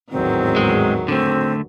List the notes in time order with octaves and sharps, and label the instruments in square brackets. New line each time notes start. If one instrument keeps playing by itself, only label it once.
[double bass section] A1 E2 G#2 [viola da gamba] D#3 F#3 [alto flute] C4
[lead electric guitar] G#3
[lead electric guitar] D3 A3 [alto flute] C4